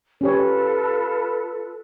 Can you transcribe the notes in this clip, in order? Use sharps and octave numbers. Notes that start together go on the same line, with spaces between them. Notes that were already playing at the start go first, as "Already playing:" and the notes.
C#4 F4 G4 A4 B4 C#5